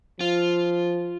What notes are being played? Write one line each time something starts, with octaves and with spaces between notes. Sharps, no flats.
F3 F4